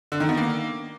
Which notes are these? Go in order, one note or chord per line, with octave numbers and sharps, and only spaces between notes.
D3
D#3
B3
A#3